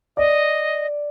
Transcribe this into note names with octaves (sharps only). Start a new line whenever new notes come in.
D5 D#5